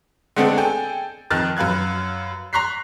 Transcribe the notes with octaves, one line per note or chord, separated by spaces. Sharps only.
D3 G#3 A3 B3 C4 D4
G#4 A4 G5
F2 D#3 F6 F#6 A6
F#2 B4 F5 F#6 G#6
A#5 C6 C#6 F#6 B6 C7